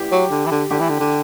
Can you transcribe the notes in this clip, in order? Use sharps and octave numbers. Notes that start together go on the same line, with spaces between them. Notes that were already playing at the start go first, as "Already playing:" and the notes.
Already playing: G4
F#3
D3
E3
D3
D3 G4
E3
D3
D3